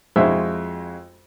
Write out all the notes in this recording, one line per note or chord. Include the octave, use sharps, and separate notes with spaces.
F2 G#3 E4 F#4 C5 E5